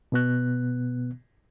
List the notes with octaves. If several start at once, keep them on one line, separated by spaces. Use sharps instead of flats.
B2 B3 F#6